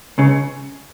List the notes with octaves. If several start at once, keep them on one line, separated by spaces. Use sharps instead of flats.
C#2 C#3